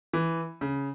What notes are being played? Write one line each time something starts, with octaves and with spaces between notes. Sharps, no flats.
E3
C#3